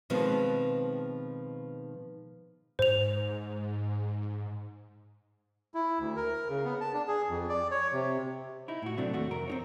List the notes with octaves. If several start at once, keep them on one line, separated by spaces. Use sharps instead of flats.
B2 D#3 F3 G#3 B3 C4
G#2 C5 F7
E4
D2
A#4
C#3
B3
A5
D4
G#4
F2
D5
C#5
C3
D#4 E4
A2 F#4
C3 F#3 A3 C4 D4
D#2 A3 F#4
F2 C3 A#4
C4 D#4 C#5